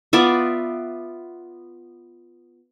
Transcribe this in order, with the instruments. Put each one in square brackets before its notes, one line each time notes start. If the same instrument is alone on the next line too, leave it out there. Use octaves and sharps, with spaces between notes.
[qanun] B3 F4 D5 E5